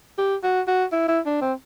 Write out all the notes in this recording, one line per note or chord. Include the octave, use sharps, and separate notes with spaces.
G4
F#4
F#4
E4
E4
D4
C4